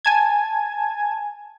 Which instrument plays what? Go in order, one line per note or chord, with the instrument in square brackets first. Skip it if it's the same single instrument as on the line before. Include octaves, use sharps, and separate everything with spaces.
[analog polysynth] G#5 A5 G#6